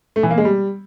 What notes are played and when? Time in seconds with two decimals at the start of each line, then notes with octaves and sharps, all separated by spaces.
0.16 A3
0.23 E3
0.30 A#3
0.38 G#3
0.45 G3